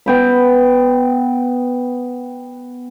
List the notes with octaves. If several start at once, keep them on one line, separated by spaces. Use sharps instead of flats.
B3 G5 B5